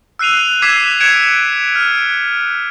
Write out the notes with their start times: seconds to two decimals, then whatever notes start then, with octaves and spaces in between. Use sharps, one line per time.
0.19 E6 F#6 C7 D#7 F7
0.62 D6 E6 G#6 B6 C7 E7
1.00 F#6 G#6 C#7 D7 E7
1.75 F6